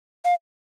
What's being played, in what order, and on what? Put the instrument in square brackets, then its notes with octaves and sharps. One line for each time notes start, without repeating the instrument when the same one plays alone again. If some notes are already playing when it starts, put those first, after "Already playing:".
[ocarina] F5